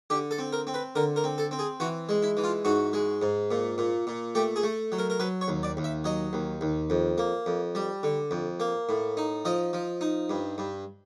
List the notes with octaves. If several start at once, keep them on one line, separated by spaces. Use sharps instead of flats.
D3 G4
A4
C4
A#4
C4
B4
D3 A#4
A#4
C4
A4
C4
G#4
E3 F#4
G#3
E4
E3
F4
G#2 F#4
G#3
G#2
A#2
A#2
A#2
A3 G4
G#4
A3
F#3
A#4
A#4
F#3 B4
C#5
D#2
D5
D#2
E5
F#3 D#5
D#2
D#2
F2
A#3
F2
G3
D3
F2
A#3
A2
D#4
F3 D#5
F3
D#4
G2
G2